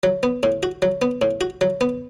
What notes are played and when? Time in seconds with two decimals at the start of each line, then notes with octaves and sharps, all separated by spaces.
0.03 F#3
0.23 B3
0.43 A2
0.63 F#4
0.82 F#3
1.02 B3
1.22 A2
1.41 F#4
1.61 F#3
1.81 B3